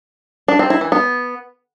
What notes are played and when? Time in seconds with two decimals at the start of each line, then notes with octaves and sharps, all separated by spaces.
0.48 D4
0.59 C4
0.70 E4
0.81 E3
0.92 B3